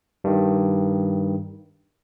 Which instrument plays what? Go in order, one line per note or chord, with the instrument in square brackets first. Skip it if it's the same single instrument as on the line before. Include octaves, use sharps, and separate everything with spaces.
[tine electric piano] G2 D#3